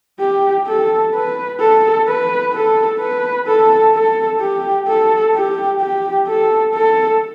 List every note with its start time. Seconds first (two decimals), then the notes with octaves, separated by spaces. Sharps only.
0.20 G4
0.67 A4
1.14 B4
1.60 A4
2.07 B4
2.53 A4
3.00 B4
3.47 A4
3.94 A4
4.40 G4
4.88 A4
5.35 G4
5.81 G4
6.27 A4
6.74 A4